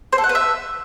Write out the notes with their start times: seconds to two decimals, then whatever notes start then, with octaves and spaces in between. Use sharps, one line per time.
0.13 C5
0.18 A4
0.24 F#5
0.29 B4
0.35 E5